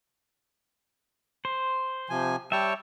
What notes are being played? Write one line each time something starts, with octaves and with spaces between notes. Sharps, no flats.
C5
C3 F3 G#5
G3 C#5 E5 G5 A5